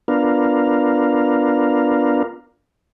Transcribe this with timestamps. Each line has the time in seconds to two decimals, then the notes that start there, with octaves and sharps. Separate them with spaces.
0.08 B3 D4 F4 A#4